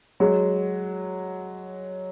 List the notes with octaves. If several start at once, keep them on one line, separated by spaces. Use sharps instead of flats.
F#3 G#3